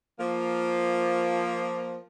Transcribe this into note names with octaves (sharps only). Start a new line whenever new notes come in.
F3 A#3